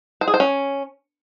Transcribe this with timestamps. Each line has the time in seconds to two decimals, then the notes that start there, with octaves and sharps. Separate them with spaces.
0.21 C5
0.28 G#4
0.34 C5
0.40 C#4